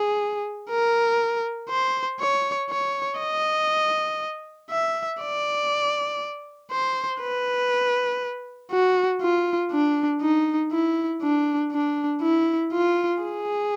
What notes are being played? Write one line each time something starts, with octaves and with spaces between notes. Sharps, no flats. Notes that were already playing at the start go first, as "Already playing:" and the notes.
Already playing: G#4
A#4
C5
C#5
C#5
D#5
E5
D5
C5
B4
F#4
F4
D4
D#4
E4
D4
D4
E4
F4
G#4